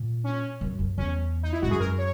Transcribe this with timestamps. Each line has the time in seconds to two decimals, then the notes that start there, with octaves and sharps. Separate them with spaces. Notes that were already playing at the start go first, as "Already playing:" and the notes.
Already playing: A#2
0.24 C#4
0.61 F#2
0.79 F#2
0.98 E2 C#4
1.43 D#4
1.52 E4
1.62 G#2 F#4
1.71 F#2 G#4
1.80 A#4
1.98 C#5